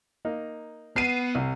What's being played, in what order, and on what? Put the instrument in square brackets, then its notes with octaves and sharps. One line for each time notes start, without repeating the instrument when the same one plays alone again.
[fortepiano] A#3 D#4
[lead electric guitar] B3 [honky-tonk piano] C7 D#7
[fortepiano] C2